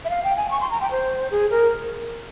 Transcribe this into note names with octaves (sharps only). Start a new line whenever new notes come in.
E5
F5
G5
G#5
C#6
C6
A#5
G5
C5
G#4
A#4